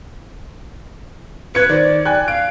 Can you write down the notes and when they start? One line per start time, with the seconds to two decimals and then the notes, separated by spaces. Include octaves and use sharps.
1.55 B4 G#6 C#7
1.69 D#3 C5 D5
2.05 G5 G#5 F#6
2.28 F5 D7